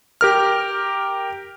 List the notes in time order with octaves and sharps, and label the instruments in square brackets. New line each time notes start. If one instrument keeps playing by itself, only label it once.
[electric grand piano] G4 A#4 F6